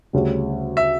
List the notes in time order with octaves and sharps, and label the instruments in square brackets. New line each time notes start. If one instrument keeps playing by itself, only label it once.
[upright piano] D2 C#3 G3
[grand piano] E5